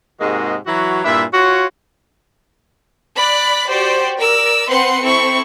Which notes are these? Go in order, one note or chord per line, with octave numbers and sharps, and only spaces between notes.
G#2 C3 G#3 A#3 F#4 D#5
E3 F#3 E4 F#4
G2 A#2 D4 E4 E5
F4 F#4 C#5
D5 B5 F#6
F#4 G4 C5 D5
A#4 D5 E6
C4 B4 F#5 C6 C#7
C4 E4 A4 C#6